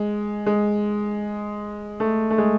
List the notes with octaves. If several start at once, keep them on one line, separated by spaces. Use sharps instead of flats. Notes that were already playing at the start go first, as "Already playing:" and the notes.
Already playing: G#3
G#3
A3
A3
G#3